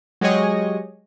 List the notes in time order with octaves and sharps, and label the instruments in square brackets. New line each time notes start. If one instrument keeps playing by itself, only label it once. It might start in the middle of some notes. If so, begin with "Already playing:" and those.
[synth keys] F#3 G#3 G4 G#4 C#5 D#5